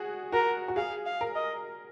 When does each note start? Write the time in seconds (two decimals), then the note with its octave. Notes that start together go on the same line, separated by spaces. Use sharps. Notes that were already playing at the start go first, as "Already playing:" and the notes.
Already playing: F#4 G#4
0.32 F#4 A#4
0.68 F#4
0.76 G#4 F5
1.06 F5
1.21 A#4
1.35 D#5